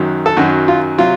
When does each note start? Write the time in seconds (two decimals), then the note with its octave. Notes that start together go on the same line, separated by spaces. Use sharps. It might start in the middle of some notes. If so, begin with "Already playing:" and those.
Already playing: F#2 D#3 F#3
0.26 A4
0.37 F#2 D#3 F#3 F#4
0.68 F4
0.98 C3 F#3 F4